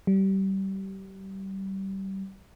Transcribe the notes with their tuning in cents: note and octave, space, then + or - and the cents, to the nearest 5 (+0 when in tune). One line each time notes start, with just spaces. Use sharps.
G3 -25